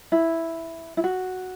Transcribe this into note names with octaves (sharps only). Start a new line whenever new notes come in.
E4
E4
F#4